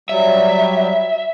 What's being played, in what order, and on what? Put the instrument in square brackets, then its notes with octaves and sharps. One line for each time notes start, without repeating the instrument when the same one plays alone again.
[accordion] F#3 G3 [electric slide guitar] E5